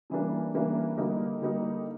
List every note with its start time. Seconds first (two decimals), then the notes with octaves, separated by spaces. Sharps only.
0.10 C#3 E3 G3 A#3 D4
0.54 C#3 E3 G3 A#3 D4
0.97 D3 G3 A#3 D#4
1.42 D3 G3 A#3 D#4